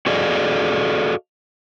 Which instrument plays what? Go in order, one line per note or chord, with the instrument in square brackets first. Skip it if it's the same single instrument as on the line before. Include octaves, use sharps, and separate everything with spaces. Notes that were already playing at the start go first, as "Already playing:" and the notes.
[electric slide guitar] F#4 G#4 A4 D5 D#5 F5